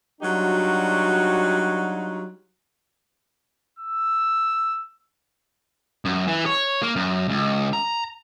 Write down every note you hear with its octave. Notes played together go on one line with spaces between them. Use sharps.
F#3 G3 D4 D#4 F4 F#4
E6
F#2
E3
C#5
A#3
F#2
C#2
A#5